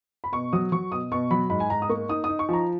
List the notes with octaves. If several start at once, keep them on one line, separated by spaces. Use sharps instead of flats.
B5
B2 C#6
F#3 D#6
F#3 C#6
B2 D#6
B2 C#6
F#3 B5
G#2 B5
G#5
G#2 A#5
D#6
A#3 C#6
D#4 D#6
D#4 D#6
C#6
F3 A#5